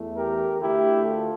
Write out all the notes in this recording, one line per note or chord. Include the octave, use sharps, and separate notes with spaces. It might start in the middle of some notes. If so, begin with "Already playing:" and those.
Already playing: E2 E3 A3
G4 A#4
D2 D3 A3 E4 G4
F4 A4